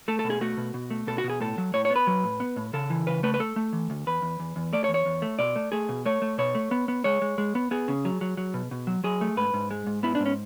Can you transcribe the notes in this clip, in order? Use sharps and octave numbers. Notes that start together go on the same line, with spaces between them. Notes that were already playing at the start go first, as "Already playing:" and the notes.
A3 A4
A4
B2
G#4
A3 F#4
B2
B2
A3
B2 A4
F#4
B2
G#4
A2 A4
F#3
A2 C#5
C#5
B3
B4
F#3
A2
B3
A2
C#3 A4
E3
C#3 B4
A3 B4
B4
A3 A4
A3
E3
D2
E2 B4
E2
E2
E2
A3 D5
C#5
E2
C#5
E2
A3
B2 D5
A3
A3 G#4
B2
A3 C#5
A3
B2 C#5
A3
B3
B3
G#3 C#5
G#3
G#3
B3
B3 G#4
C#3
F#3
F#3
F#3
B2
B2
F#3
F#3 G#4
A3
G#2 B4
G#2
G#3
G#2
B3 E4
G#2 D4
C#4